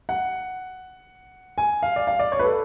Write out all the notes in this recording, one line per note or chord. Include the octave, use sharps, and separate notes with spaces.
F#5
G#5
F5
D5
F5
D5
C#5
B4
A4